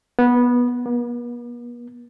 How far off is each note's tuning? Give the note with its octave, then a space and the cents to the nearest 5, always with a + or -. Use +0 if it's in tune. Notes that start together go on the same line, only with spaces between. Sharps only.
B3 -15
B3 -45